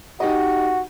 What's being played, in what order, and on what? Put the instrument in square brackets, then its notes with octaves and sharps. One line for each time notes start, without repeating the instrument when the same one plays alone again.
[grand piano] D#4 G4 D#5 [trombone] F#4